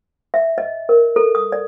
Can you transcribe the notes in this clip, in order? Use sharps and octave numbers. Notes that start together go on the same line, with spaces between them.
E5
D#5
A#4
A4
D#6
D5